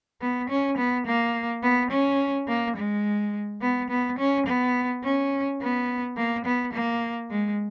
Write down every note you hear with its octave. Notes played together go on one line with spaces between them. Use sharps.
B3
C#4
B3
A#3
B3
C#4
A#3
G#3
B3
B3
C#4
B3
C#4
B3
A#3
B3
A#3
G#3